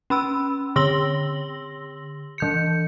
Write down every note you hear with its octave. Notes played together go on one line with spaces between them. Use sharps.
C#4 B5 E6
D3 C6 E6 A#6 F#7 G7
E3 G6 C#7